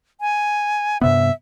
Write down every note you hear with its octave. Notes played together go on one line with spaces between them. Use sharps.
G#5
G2 C3 B3 E5